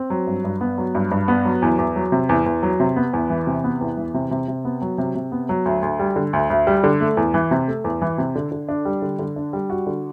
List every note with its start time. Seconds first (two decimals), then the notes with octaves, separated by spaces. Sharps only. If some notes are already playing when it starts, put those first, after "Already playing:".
Already playing: C4
0.10 F#3
0.27 G2
0.44 G2
0.61 B3
0.78 F#3
0.95 G2
1.11 G2
1.28 B3
1.45 F#3
1.62 E2
1.78 E2
1.96 F#3
2.12 C3
2.29 E2
2.46 E2
2.63 F#3
2.80 C3
2.96 B3
3.13 E2
3.30 E3
3.47 C3
3.64 B3
3.81 E2
3.97 E3
4.14 C3
4.31 C3
4.48 C3
4.65 B3
4.82 F#3
4.98 C3
5.15 C3
5.32 B3
5.49 F#3
5.65 D2
5.83 D2
5.99 G3
6.16 D3
6.33 D2
6.50 D2
6.67 G3
6.84 D3
7.00 A3
7.17 E2
7.34 E3
7.51 C3
7.68 A3
7.84 E2
8.02 E3
8.18 C3
8.35 D3
8.52 D3
8.69 D4
8.85 G3
9.02 D3
9.19 D3
9.36 D4
9.53 G3
9.70 F#4
9.87 D3